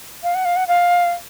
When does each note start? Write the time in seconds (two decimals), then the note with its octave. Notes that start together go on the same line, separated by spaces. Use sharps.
0.23 F5
0.35 F#5
0.45 F5
0.56 F#5
0.67 F5